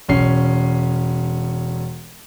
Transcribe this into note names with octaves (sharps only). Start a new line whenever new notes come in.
E1 C#4 C7